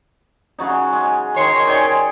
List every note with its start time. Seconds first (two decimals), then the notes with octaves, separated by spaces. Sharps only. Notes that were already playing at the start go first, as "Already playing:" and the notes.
0.59 C#3 F#3 D#4
0.93 G#3
1.36 D#3 C#5 C6
1.68 G#4 D5 G5